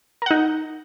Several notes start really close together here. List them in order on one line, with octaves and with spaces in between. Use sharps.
A#4 F#5 D#4